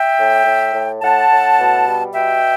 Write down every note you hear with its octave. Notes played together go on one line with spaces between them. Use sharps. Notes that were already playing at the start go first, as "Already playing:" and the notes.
Already playing: E5 G5
A2
A2
A2
A2 F#5 A5
A2
B2
G3
B2 E5 G5